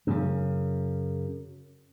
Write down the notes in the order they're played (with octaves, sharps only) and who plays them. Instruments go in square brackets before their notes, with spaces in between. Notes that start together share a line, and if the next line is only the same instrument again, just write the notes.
[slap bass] F#2 C#3